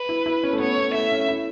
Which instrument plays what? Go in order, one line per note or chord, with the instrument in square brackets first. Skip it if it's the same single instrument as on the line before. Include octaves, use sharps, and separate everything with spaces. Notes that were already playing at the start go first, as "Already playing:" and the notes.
Already playing: [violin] B4
[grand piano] E4
E4
C#4
A3
[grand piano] B3 [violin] C#5
[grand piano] B3
[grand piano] A3 [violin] E5
[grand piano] C#4
E4